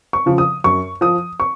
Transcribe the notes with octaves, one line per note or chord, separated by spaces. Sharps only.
C#6
C#3 F3
D#6
F#2 C#6
F3 D#6
C#6